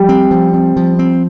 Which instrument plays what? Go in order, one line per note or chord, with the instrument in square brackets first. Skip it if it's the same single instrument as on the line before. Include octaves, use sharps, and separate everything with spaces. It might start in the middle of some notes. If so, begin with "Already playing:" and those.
Already playing: [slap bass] F3 [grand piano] G3
[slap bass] C4
F3
C4
F3
C4